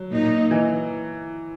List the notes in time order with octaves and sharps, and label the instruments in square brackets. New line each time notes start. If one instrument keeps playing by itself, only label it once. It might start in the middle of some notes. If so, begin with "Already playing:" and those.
Already playing: [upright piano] F#3
[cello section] A#2 A#3 D#4
[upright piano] E3